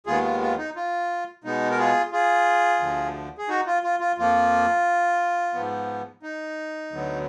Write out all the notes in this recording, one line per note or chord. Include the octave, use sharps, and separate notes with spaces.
D#2 D#3 G#3 B3 F4 G#4
F4
F4
D#4
F4
B2 G#3 B3 D#4
A#4
F4 G#4
F4 G#4
D2 D3 F3
G#4
D#4 F#4
F4
F4
F4
F2 F3 A#3 F4
G#2 F3 B3
D#4
D2 D3 F#3 B3